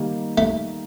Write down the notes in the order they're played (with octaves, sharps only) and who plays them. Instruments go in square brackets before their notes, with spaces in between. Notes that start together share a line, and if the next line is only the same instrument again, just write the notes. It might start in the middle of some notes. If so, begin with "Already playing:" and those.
Already playing: [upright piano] D#3 G3 A#3
[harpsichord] A3